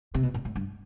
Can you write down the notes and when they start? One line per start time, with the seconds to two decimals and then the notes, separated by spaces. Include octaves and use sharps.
0.14 C3
0.23 B2
0.34 A#2
0.45 A2
0.56 G2